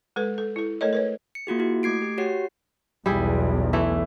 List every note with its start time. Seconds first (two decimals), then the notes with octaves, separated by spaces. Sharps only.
0.16 G#3 A4 B4
0.38 A4
0.56 E4 A4
0.81 A3 A4 A#4 C#5 D#5
0.93 A#4 B4 C#5
1.35 C#7
1.47 A#3 F4 F#4 G#4
1.59 E4 F#4
1.83 A3 D6 G#6 C7 D7
2.02 G4
2.18 F#4 G4 C#5 F#5 C7
3.06 B1 E2 G3 E4 G#4
3.73 E3 A3 E4